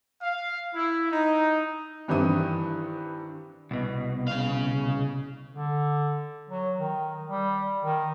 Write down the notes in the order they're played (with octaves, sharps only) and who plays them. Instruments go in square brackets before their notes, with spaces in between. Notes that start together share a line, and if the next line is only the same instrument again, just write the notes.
[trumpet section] F5
E4
D#4
[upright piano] G2 D#3 E3 C4 E4 D#6
[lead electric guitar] C2 B2
[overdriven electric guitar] C#3 F5
[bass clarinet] D3
F#3
D#3
G3
D#3